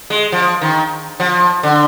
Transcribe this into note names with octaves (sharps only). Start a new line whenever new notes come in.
G#3
F3
D#3
F3
D3